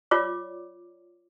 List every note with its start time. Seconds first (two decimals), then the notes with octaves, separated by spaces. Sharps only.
0.11 F4 C#5 D5 D6